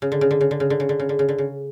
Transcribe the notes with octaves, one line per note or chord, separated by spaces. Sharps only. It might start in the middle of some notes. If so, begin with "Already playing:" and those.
C#3
D3
C#3
D3
C#3
D3
C#3
D3
C#3
D3
C#3
D3
C#3
D3
C#3